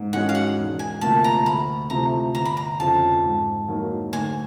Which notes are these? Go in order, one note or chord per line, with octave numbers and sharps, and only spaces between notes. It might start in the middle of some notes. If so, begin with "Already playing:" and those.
Already playing: G#2
D#3 G#3 C#4 F#4 F#5
F5
F#5
E1
G#5
D2 C3 F3 A#3 A5
A#5
D2 B5
C3 F3 A3 A#5
G1 A#5
B5
A#5
F2 C#3 F3 A5
G#2
D#3 F#3 A#3
D2 G#5